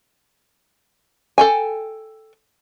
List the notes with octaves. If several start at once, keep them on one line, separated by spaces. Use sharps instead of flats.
A4 G5 G#5